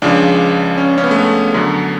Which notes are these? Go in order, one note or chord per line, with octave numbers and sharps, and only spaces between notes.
C#2 C#3 F3 D4
C#4
C#4
B3
A3
B3
F#2 D3 F#3